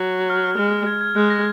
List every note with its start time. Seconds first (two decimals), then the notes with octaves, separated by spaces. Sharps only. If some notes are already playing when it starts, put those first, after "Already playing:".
Already playing: F#3
0.30 F6
0.44 F6
0.58 G#3 F6
0.86 G#6
1.01 G#6
1.15 G#3 F#6
1.30 A#6